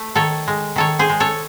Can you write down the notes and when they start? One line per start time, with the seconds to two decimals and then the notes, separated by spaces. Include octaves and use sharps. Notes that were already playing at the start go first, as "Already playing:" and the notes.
Already playing: A3
0.15 D#3 A4 C#5
0.48 G#3
0.76 D#3 A4 C#5
0.99 G#4 C5
1.10 G#3
1.20 A4 C#5